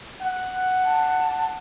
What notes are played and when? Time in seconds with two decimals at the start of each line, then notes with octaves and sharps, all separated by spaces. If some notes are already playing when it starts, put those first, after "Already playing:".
0.22 F#5
0.84 A5